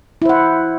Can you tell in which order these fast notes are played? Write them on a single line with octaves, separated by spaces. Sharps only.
E4 C5 F#5